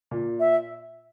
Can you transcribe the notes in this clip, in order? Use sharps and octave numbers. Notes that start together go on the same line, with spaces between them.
A#2
E5